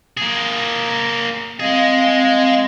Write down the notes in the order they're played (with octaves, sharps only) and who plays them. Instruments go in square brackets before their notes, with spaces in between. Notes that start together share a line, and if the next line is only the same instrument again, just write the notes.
[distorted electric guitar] A#3 G#4
[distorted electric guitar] G#3 G#4 [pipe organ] C4 D#5 F5